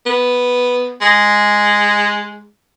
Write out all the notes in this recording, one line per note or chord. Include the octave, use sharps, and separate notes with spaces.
B3
G#3